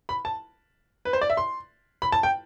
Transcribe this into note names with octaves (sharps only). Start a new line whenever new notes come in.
B5
A5
B4
C5
D5
E5
C6
B5
A5
G5